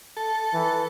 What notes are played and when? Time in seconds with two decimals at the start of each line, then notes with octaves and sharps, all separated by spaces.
0.17 A4
0.54 E3